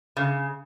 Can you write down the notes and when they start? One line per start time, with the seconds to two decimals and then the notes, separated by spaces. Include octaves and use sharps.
0.17 C#3